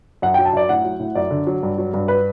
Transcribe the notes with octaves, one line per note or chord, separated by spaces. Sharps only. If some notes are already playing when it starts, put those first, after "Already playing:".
F#2 F#5
F#3 G5
A5
F#2 D5
A2 F#5
F#3
A2
F#2 D5
D3
F#3
G2
F#3
G2
B4